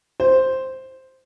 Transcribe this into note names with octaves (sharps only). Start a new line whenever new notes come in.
C5